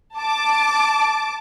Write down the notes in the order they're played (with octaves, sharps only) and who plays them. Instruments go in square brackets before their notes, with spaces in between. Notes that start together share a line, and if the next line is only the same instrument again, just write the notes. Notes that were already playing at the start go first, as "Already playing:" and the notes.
[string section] A5 D6